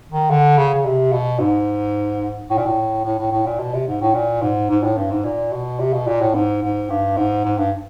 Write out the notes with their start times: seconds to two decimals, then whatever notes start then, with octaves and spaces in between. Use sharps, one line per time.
0.12 D#3
0.30 D3
0.58 C#3
0.74 C#3
0.85 C3
1.13 B2
1.40 G#2
2.50 A2
2.58 A#2
2.66 A2
3.05 A2
3.19 A2
3.32 A2
3.46 A#2
3.60 B2
3.74 C3
3.88 G#2
4.01 A2
4.15 A#2
4.42 G#2
4.70 G#2
4.84 A2
4.98 G2
5.11 G#2
5.25 A#2
5.52 B2
5.80 C3
5.93 B2
6.07 A#2
6.21 A2
6.35 G#2
6.62 G#2
6.90 G2
7.17 G#2
7.45 G#2
7.58 G2